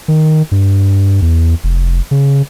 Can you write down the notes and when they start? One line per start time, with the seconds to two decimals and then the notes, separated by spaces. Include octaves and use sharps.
0.08 D#3
0.51 G2
1.22 E2
1.64 F1
2.11 C#3